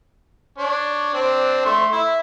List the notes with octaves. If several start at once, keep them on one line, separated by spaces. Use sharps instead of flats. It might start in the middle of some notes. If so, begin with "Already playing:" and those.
D4 C#5
C4 D4
A3 C6
E4